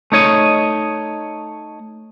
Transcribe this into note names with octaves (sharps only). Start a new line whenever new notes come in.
A3 D#4 C#5 D#5